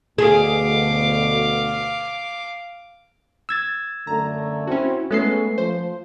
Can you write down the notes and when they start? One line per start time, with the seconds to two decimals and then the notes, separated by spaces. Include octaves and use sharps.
0.18 D2 B2 G#4 F5 D6
3.49 E6 G#6 A6
4.07 F#2 D3 A3 A#5
4.67 C4 C#4 E4 F#4
5.11 G#3 A3 B3 C#4 A4 B4 C7
5.58 F3 C5